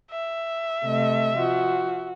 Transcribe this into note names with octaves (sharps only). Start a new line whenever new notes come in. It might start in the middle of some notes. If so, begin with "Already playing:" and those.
E5
C3 A3 D#5
F3 F#4